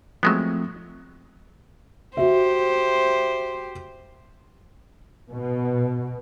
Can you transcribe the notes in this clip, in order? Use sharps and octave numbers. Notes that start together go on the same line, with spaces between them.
F3 F#3 G#3 A3 B3 C4
F#4 G4 C5 E5
B2